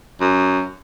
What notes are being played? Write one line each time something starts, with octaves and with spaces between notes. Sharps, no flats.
F#2